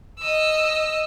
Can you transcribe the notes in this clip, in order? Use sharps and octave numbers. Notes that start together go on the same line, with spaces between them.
D#5 E6